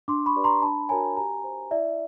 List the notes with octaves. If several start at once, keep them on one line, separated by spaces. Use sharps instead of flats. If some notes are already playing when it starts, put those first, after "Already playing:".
D4 C6 D6
B5 C#6
G4 B4 D5
A#5 C6
D4 A5 B5
F#4 A#4 C#5 G#5 A#5
G4 G#5 A#5
C5
E4 D5 E5